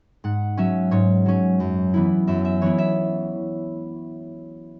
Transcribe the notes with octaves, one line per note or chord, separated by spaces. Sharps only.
G#2 F#5
F#3 C#4 E5
G#2 C#5
F#3 C#4
F#2
E3 B3 E4
F#2 E5
E5
E3 B3 E4 C#5
E5